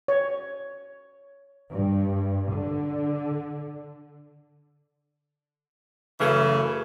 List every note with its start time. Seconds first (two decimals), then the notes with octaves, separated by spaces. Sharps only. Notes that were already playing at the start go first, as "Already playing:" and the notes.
0.08 C#5
1.73 G2
2.53 D3
6.20 F#2 C#3 E3 A3